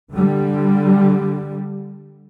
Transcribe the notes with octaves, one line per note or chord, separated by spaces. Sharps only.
D3 G3